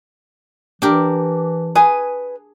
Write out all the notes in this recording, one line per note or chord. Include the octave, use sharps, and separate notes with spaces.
E3 D4 G4 A#4
G#4 B4 G#5